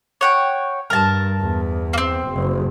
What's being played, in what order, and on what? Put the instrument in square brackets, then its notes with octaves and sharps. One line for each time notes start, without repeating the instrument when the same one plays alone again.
[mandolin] C#5 F#5 G5
[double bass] G2 [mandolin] A#4 A5
[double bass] E2
[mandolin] A#3 C4
[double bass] F#1